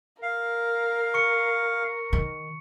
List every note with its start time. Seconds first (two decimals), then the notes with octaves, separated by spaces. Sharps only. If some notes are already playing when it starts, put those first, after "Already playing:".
0.23 A#4 F5
1.14 C#6 C#7
2.13 D#3